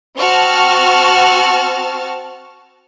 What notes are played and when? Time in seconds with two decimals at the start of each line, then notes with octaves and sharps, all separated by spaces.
0.16 C4 F#4 A5 F6